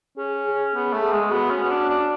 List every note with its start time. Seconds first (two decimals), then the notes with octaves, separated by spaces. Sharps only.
0.17 C#4 G#4
0.46 G#4
0.74 B3 G#4
0.93 A3
1.03 G#4
1.12 G#3
1.31 B3 F#4
1.50 C#4
1.63 C#4
1.70 D4
1.89 D4